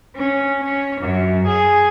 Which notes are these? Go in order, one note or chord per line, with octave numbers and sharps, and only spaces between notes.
C#4
C#4
F#2
G#4